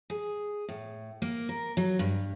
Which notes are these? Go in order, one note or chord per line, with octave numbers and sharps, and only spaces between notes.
G#4
A2
A#3
A#4
F#3
G2